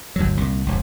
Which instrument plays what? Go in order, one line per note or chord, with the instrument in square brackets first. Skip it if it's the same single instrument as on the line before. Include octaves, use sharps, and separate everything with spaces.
[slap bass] G1 D2 F#3
C2 A#2
E1 C#2